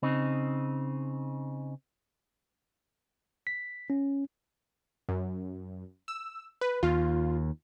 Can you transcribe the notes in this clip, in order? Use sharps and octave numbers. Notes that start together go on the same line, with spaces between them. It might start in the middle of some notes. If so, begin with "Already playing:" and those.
C#3 C4 D#4
B6
C#4
F#2
E6
B4
D#2 F4